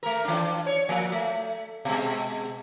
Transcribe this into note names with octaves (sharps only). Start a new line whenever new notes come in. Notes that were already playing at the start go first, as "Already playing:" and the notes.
A3 A#4
E3 D4
C#5
F3 A#3
A3
B2 G#3